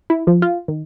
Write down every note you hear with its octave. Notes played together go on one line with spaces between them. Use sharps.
E4
F3
F4
D#3